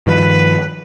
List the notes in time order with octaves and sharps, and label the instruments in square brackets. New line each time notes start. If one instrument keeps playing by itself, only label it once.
[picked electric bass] G2 D#3 F3 [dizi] B4